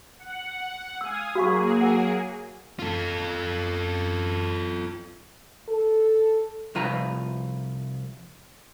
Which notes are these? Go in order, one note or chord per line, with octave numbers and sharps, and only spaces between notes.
F#5
F5 G#5 D#6 E6
F#3 A#3 F#4 G#4 F5 C#6
A#4 F#5
F4 A4
A4
C2 F3 F4 B4 A#5